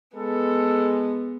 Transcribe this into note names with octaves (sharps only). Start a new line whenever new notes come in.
G#3 B3 A4